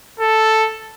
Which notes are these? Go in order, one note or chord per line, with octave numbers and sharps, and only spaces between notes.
A4